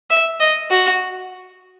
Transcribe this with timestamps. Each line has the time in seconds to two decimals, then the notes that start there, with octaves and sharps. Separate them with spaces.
0.10 E5
0.40 D#5
0.70 F#4